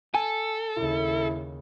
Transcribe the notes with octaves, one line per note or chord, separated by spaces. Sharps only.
A4 G#5
D#2 C#3 E4